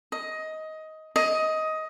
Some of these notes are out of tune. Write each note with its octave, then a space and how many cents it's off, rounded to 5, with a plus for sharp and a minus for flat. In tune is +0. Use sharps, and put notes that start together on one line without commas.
D#5 +15
D#5 +15